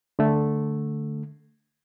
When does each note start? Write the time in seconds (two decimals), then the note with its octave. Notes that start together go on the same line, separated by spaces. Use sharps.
0.19 D3 A3